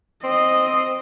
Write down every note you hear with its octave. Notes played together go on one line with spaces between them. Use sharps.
C4 D#5